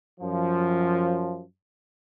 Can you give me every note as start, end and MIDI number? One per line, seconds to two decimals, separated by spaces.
0.19 1.41 42
0.19 1.41 53